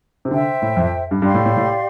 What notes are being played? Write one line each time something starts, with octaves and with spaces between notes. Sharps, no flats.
C3
D3 C5 E5 G5
A2
F2
G2
G2 G4 D5 F5 C6
A2
A2
A2